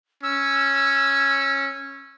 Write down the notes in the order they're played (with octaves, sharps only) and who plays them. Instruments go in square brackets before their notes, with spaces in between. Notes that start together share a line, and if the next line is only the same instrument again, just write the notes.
[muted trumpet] C#4 [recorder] E6